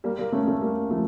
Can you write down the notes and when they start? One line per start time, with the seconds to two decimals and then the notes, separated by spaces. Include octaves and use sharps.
0.04 G3 A#3
0.18 G3 A#3
0.32 A3 C#4
0.47 A3 C#4
0.61 G3 A#3
0.90 F3 A3